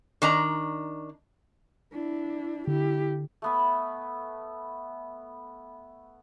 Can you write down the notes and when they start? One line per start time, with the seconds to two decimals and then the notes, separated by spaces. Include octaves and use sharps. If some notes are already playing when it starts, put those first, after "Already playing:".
0.22 D#3 D4 A#5
1.93 D4 E4
2.67 D3 E4 G4
3.42 A3 B3 B5